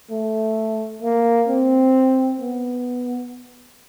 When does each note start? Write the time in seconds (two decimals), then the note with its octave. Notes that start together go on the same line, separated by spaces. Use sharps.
0.10 A3
1.02 A#3
1.48 C4
2.40 B3